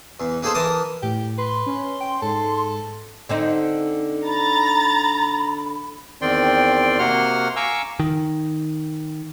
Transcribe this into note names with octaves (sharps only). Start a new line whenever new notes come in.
E2
A#3 D#4 G#4 A4 C5
E3 A#4 A5 D6 D#6
A2 G4
B4 C6
C#4
G5
G#2 A4
D3 C4 D#4
A#5 B5 A6
E2 D#3 C4 D5 G5 C6
C3 A#3 F#4 F#5 C6 F6
F5 G#5 A#5 C#6 D6 E6
D#3